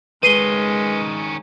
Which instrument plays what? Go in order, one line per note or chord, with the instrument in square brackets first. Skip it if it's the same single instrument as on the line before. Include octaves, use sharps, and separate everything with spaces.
[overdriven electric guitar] D#3 C#4 [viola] G#3 [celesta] B4 C7 G7 [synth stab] D#7